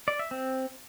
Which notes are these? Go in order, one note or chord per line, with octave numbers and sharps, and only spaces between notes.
D5
E5
C4